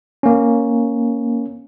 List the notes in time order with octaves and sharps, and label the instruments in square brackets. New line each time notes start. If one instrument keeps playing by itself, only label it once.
[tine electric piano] A#3 C#4